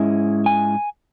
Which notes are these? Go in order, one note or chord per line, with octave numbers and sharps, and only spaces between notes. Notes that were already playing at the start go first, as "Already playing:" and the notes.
Already playing: G#2 G#3 C#4 E4
G#5